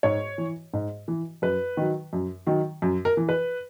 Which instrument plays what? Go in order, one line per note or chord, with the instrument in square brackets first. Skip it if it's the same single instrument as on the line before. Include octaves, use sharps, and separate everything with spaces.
[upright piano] G#2 C#5
E3
G#2
E3
F#2 B4
D#3 F#3
F#2
D#3 F#3
F#2
A#4
E3
B4